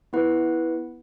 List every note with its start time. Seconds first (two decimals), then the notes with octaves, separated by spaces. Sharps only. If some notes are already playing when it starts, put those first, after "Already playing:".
0.13 B3 E4 B4 F#5